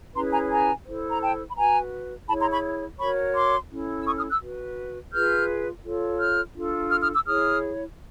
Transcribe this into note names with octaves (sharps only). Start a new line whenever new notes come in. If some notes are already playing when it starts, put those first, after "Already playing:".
C#4 E4 G#4 B4 A#5 C6
G#5 A#5
G#5 A#5
E4 A4 C5
A#5
G5 A5
B5
F#4 B4 G#5 A#5
E4 G#4 C#5 A5 B5
A#5 C6
B5 C#6
F#4 A#4 C#5 B5 C#6
C6 D6
C#4 E4 A4
E6
C#6 D#6
D#6 F6
E6 F#6
F#4 B4
F4 G#4 B4 F6 G6
F4 A4 C#5
F6 G6
D4 F4 A4
D#6 F6
D#6 F6
D6 E6
E4 G#4 C#5 D#6 F6